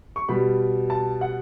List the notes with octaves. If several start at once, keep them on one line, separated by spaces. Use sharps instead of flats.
C#6
B2 G3 B5
A5
F#5